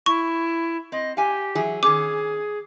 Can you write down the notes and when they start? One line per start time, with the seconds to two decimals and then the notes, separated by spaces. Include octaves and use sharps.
0.06 E4 C#6
0.92 C4 D#5
1.17 G4 F5 G#5
1.55 E3 F#3 G#4
1.83 D#3 C#4 G#4 D6